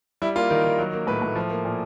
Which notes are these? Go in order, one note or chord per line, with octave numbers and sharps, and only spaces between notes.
G3 E4
A#3 F4
D#3 A#4
D#3
F#3
A#3
A2 B4
A2
F3
A#3
A#2